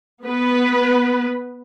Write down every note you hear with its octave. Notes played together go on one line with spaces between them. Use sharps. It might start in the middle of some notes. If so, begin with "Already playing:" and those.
B3 B4